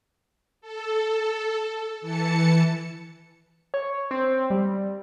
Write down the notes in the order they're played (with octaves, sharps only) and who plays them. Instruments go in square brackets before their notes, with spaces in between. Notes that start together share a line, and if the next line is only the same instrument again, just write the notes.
[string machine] A4
E3 A5 C#7
[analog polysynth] C#5
C4
G3